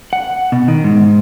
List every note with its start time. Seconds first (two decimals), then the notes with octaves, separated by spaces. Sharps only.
0.13 F#5
0.52 B2
0.68 D#3
0.84 G#2